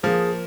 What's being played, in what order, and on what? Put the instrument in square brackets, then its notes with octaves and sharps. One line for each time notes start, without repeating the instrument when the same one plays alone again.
[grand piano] F3 A#3 [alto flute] G#4